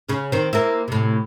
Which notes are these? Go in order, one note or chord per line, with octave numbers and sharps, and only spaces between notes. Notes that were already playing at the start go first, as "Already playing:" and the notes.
C#3 C#4
D#3 C4
A#3 C4 E4
A2 C3